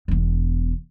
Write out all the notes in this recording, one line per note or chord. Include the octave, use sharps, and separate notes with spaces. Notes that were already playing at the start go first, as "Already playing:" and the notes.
E1 E2